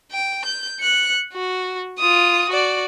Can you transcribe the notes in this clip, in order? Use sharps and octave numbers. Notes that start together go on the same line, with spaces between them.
G5
G6
F#6 C#7
F#4
F4 D#6
F#4 D5